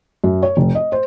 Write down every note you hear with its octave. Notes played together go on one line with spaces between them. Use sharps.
F#2
C#5
F1
D#5
C5